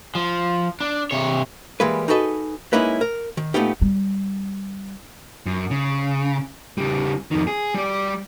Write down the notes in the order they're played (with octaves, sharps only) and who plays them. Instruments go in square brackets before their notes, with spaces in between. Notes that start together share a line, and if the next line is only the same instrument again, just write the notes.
[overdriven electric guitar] F3
D4
C3 C#5
[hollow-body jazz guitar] E3 G3 G#3 A#3 B4
D#4 F#4 G#4 A4 B4 D#5
G#3 A#3 C#4 D#4 E4 B4
A#4
D#3
A#2 G3 A3 B3 D#4 G4
[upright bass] G3
[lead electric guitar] F#2
C#3
C#3 G3
F2 D#3
G#4
G3 D5